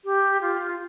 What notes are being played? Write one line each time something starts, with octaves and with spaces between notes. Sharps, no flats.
G4
F4